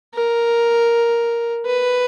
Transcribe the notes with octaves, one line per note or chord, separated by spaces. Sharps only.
A#4
B4